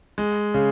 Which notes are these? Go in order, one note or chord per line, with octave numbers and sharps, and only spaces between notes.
G#3
C#3